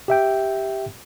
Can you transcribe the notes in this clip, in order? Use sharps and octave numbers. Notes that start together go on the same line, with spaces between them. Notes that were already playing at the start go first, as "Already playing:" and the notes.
G4 E5 G5